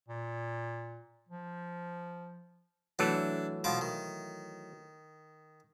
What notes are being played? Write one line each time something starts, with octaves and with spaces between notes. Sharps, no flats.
A#2
F3
E3 F#3 A3 D4
B2 F3 D6
D#3